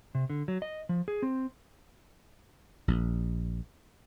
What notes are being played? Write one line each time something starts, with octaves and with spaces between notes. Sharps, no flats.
C3
D3
F#3
D#5
F3
G#4
C4
A#1